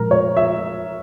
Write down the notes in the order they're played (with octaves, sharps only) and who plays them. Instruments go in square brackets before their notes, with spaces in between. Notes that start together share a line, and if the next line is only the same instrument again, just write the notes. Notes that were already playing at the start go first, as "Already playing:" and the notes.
Already playing: [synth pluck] A#2 F3 G#3 [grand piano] A#4
[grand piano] C#5
E5